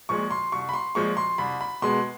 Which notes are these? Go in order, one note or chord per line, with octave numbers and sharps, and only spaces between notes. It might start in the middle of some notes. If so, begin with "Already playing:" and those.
A#2 F3 G#3 C#6
C6
C2 C#6
B5
C6
A#2 F3 G#3 C#6
C6
C2 B5
B5
B2 G#3 B3 C6